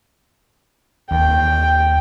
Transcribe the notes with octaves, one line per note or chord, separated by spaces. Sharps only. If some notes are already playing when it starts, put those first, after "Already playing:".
D#2 G5